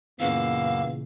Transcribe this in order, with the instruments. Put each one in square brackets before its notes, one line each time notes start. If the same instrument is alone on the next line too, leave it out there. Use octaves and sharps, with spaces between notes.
[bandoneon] F#2 A#3 E6 [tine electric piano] A#2 C#3 E3 [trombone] B3 [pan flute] F5